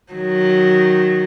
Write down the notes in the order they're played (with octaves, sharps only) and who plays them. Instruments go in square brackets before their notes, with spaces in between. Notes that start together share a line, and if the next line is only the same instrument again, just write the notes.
[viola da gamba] D#3 F#3